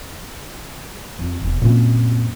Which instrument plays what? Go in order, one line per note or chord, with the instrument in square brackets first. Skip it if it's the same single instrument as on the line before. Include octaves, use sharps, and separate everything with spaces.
[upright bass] F2
E1 C3
[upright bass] F#2 A#3 [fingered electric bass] A#2 C4